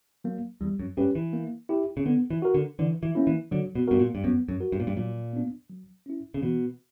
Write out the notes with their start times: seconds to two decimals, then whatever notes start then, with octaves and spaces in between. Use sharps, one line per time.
0.24 F#3 A#3
0.61 E2 G3
0.79 F#2
0.97 G2 C#4 G4 B4
1.15 E3
1.33 A#3
1.69 E4 G4
1.97 C#3
2.06 D3 B3
2.30 E3
2.42 F#4 A#4
2.54 D3
2.79 D3 E3
3.03 E3
3.15 A#3 C#4 E4
3.27 E3
3.51 D3 F#3
3.75 B2
3.88 G2 B3 F#4 A#4
3.99 A#2
4.15 G2
4.24 F#2 B3
4.48 F#2
4.60 F#4 A#4
4.72 G2
4.80 A#2
4.87 G2
4.96 A#2 F#3
5.33 B3 D4
5.69 F#3
6.06 C#4 E4
6.34 C#3
6.42 B2 E3